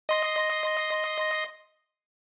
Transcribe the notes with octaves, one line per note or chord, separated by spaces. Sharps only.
D#5 C6 A#6